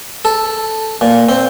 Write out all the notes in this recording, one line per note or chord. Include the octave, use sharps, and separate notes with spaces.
A4
A#2
C4